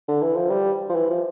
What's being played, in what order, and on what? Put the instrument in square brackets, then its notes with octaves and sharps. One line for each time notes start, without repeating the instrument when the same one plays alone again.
[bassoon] D3
E3
F3
G3
F3
E3
F3